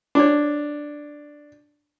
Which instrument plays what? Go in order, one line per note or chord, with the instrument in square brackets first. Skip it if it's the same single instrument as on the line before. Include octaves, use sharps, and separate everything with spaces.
[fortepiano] D4 C#5